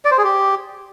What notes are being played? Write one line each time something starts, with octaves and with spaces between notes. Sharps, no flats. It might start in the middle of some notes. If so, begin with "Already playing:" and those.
D5
C5
G#4
G4